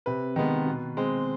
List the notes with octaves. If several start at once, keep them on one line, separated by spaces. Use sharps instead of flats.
C3 B4
D#3 G#3 B3
B2
G#3 C4